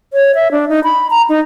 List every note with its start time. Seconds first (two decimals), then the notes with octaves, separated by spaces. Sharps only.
0.13 C#5
0.35 E5
0.52 D4
0.69 D#4
0.84 B5
1.10 A#5
1.29 D#4